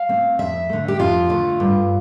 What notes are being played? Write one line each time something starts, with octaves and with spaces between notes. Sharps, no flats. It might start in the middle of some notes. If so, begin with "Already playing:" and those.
Already playing: F5
A3 C4
F2 E5
D3 A3
G4
F2 F4
D3 A3
G2